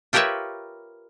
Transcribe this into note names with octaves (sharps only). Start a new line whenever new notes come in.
F4 G4 A#4 B4 C#5 E5